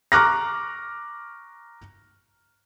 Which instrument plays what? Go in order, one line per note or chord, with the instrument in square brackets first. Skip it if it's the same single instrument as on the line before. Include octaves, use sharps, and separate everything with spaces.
[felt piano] A#5 C#6 D6 F6 F#6 A#6